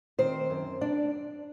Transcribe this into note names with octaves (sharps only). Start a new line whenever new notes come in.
D#3 C4 C5
F#2
D4 D5